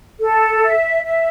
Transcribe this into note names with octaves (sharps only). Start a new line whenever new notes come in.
A4
E5
E5